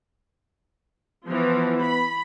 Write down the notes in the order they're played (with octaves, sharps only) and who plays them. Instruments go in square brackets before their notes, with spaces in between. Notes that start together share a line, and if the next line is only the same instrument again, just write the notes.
[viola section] E3 F3 [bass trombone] B3
[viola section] B5